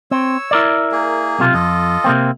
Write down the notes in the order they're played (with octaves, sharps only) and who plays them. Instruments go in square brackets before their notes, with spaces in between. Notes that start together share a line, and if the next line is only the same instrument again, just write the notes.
[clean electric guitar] C4 [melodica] C#5 E6
[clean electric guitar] E4 A#4 D5
[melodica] A#3 G#4
[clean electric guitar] B1 C3 F4
[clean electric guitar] F2 [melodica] F4 A4 D#5
[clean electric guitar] C3 A#3 C4